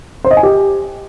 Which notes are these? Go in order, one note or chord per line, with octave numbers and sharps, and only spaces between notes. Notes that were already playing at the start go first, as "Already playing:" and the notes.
C5
D#5
G#5
G4